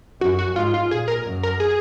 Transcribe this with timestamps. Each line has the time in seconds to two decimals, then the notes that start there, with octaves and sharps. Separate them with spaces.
0.21 F#2 F#4
0.39 F#4
0.56 G#2 F4
0.74 F4
0.91 A#2 G#4
1.08 A#4
1.25 F#2
1.43 A#4
1.60 G#4